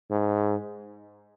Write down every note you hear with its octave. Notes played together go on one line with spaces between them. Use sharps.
G#2